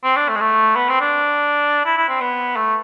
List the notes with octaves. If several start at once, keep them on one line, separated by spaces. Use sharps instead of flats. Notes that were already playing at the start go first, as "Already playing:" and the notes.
C4
D4
A3
G#3
A3
B3
C4
D4
E4
E4
C4
B3
A3